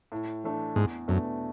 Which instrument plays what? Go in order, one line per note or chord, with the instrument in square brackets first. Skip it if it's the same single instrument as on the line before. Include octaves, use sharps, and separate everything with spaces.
[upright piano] A2
E3 A3 D4
[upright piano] E2 [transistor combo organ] G#2
[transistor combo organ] F#2 [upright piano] B2 A3 D4